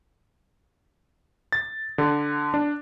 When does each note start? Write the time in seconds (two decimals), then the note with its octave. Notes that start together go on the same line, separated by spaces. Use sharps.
1.52 A6
1.98 D3
2.54 D4